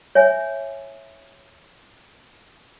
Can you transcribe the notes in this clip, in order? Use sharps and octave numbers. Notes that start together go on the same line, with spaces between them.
C#5 E5 G#5